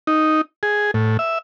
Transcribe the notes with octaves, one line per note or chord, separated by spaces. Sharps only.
D#4
G#4
A2
E5